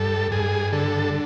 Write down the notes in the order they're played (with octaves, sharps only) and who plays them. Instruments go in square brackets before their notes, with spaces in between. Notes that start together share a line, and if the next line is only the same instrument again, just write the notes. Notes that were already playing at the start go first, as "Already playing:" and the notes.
Already playing: [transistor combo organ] G2 A4
G2 G#4
D3 A4